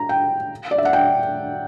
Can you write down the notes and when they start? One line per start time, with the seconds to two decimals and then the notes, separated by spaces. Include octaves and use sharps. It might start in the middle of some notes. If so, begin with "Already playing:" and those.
Already playing: A#5
0.09 G5
0.71 D5
0.78 E5
0.85 F#5
0.93 G5